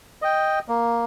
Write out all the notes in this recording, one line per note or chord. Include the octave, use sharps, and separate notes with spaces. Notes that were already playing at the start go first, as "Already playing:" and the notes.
D#5 G5
A#3